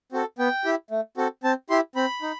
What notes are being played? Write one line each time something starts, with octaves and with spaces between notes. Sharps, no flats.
C4 F#4 A4
B3 G5
E4 G4
A3
C4 F#4 A4
C4 A5
E4 G4 C6
C4 B5
D#4